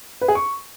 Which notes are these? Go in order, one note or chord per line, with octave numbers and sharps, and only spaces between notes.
B4
G#4
C#6